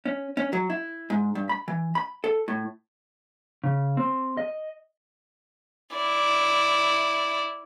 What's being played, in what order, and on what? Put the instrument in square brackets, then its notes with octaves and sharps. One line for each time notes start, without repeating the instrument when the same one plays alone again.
[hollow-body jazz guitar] C#4
C#4
F#3
E4
G#2
G2
B5
E3
B5
A4
A2
[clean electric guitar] C#3
C4
D#5
[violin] E4 D5